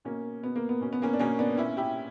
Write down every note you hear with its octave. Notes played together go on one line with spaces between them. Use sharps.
B2 A#3 C#4
B2 B3
A#3
B3
B2 C#4
B3
A#3 C#4
D4
B2 A#3 C#4
B3 D4
A#2 C#4 E4
E4 G4